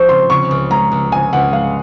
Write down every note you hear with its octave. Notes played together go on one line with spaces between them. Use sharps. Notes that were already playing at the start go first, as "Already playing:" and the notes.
Already playing: F3 C4 F4 C#6
C#3 C6
C#3 C#6
C#2
G#3 A#5
C#2
C#3 G#5
C#2 F#5
G#3 F5